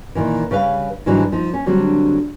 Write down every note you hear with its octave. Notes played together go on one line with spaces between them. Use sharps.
A#2 D#3 E3
C#3 G3 B4 F5
G#2 D3 E3 F#3 G3 D4
F3 D#4
C#4
D3 F#3 G3 C4 D4